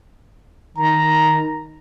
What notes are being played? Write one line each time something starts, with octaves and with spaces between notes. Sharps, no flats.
D#3 A#5